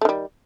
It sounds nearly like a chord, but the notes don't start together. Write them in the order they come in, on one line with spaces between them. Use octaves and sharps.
A3 D#3 G3